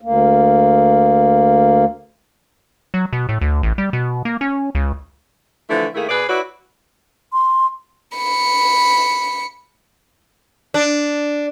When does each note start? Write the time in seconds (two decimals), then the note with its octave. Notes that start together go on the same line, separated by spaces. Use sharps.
0.01 D2 A#3
2.94 F#3
3.13 B2
3.29 A2
3.41 D2
3.63 A1
3.78 G3
3.93 B2
4.25 A#3
4.41 C#4
4.75 C#2
5.69 D3 E3 F3 A3 E4
5.95 D#3 A3 A#3 E4 G#4
6.09 B2 G#4 B4 D5
6.28 E4 F#4 B4 C#5 D5
7.33 C6
8.16 B5 C#7
10.74 D4